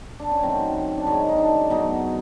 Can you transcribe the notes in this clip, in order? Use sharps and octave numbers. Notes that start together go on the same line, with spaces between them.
D4
C#4
F#2 D#3 F#3 A3 C4
D4
F#2 D#3 G#3 C#4
D#4
D4
B2 F#3 A3 D#4